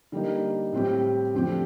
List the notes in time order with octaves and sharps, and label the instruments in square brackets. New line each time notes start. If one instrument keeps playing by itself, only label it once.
[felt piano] D3 G3 A#3 D#4
A2 G3 C4 G4
F2 D3 A3 C4 G4